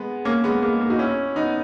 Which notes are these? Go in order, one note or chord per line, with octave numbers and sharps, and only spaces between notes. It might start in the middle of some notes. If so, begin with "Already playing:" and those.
Already playing: G#3 B3
A#3 C#4
G#3 B3
A#3
G#3
A#3
D#4 F#4
C#4 E4
B3 D#4